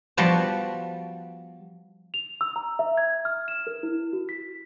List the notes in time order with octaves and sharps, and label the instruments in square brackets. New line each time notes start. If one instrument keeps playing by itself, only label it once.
[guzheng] F3 G3 B3 F#4 D5 A5
[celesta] F7
E6
A#5
E5
G#6
F6
E7
A#4
E4
F#4
B6